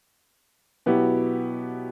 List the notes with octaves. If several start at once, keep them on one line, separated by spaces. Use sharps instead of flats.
B2 F#3 B3 E4 G4